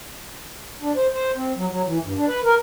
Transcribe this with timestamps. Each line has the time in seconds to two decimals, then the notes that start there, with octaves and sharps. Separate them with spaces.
0.82 D4
0.96 C5
1.14 C5
1.36 C4
1.56 F#3
1.71 F#3
1.86 E3
2.02 G2
2.16 D4
2.28 B4
2.44 A#4